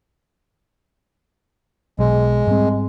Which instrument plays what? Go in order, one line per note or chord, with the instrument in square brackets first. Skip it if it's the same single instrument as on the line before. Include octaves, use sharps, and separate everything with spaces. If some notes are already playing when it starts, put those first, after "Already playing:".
[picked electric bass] B1 [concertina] G#3
[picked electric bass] G#2 G3 C4